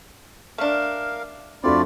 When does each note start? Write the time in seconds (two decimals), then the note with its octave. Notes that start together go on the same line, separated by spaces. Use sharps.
0.58 A3 D4 A#4 F5
1.64 F2 A3 C4 D4 F4 F#4 D5 B5